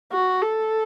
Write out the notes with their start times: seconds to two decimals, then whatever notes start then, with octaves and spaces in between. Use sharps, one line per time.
0.13 F#4
0.41 A4